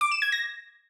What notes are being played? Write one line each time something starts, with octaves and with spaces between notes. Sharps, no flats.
D6
E7
G#6
A#6